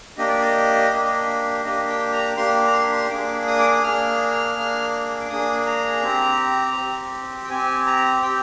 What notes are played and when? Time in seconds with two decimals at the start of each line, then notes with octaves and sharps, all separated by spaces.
0.18 A#3 D4 G4 D#5
0.28 D5
0.40 D#5
0.91 A#3 D4 G4
1.63 A#3 D4 G4 D#5
1.89 G5
2.13 A#5
2.37 A#3 D4 G4 C6
2.67 A#5
2.74 C6
2.92 C6
3.10 A#3 D4 G#4 D6
3.47 D#6
3.59 D6
3.72 D#6
3.83 A#3 D4 G#4 F6
4.56 A#3 D4 G#4
5.20 D6
5.30 A#3 D4 G#4 D#6
5.67 A#5
6.02 C4 G4
6.76 C4 G4
7.44 G5
7.49 C4 G4 G#5
7.86 A#5
8.22 C4 G4 G5